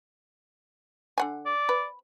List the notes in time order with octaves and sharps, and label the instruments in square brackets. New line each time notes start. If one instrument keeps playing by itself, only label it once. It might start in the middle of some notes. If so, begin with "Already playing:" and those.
[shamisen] D3 F#5 G#5
[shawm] D5
[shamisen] B4